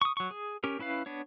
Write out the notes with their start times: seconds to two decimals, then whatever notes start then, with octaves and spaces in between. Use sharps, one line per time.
0.02 C#6 D#6
0.17 F#3 C#6
0.31 G#4
0.64 C#4 G4 A#4
0.79 C#4 E4 B4 F5
1.06 B3 D4 C#5